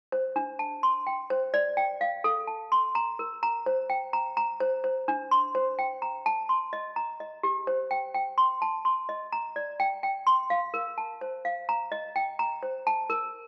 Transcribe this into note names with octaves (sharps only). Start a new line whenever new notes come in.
C5
D4
A5
C6
G5
C5
D5
G5
F5
A4
A5
C6
A#5
A#4
A#5
C5
G5
A#5
A#5
C5
C5
D4
C6
C5
G5
A#5
A5
C6
D#5
A#5
D#5
G4
C5
G5
G5
C6
A5
C6
D#5
A#5
D5
G5
G5
C6
F5
A#4
A5
C5
F5
A#5
D#5
G5
A#5
C5
A5
A#4